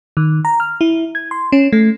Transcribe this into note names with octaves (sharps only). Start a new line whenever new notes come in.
D#3
A#5
F6
E4
G#6
C6
C#4
A3